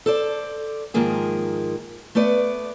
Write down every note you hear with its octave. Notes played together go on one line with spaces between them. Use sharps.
A4 C5 D5
G#2 D#3 F3 A#3 G#4
A3 B3 B4 D5